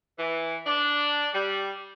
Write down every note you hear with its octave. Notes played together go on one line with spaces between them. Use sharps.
E3
D4
G3